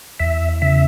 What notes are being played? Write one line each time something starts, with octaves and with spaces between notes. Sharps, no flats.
E2 E5
C#3 E5